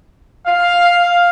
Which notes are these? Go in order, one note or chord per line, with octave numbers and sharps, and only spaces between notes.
F5